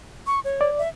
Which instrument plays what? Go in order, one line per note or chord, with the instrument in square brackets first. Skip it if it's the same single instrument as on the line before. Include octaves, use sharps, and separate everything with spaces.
[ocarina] C#6
C#5
[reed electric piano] D5
[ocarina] E5